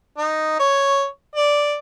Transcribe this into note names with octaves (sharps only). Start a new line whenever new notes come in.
D#4
C#5
D5